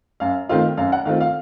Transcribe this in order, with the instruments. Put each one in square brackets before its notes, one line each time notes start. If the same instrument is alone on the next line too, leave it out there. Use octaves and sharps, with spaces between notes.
[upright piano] F#2 F5
D#3 A3 C4 F4 F5
F#2 F5
F#5
D#3 A3 C4 F4 F5
F5